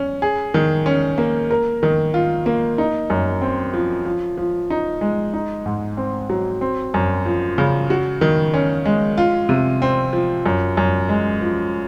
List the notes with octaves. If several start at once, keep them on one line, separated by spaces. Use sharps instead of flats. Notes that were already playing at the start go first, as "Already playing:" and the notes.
Already playing: C#4
G#4
D#3
C#4
A#3
A#4
D#3
F4
A#3
D#4
F#2
C4
F3
F3
F3
D#4
G#3
D#4
G#2
C4
F#3
C4
F#2
F3
C#3
F#4
D#3
C#4
G#3
F4
C3
C4
F3
F#2
F#2
G#3
F3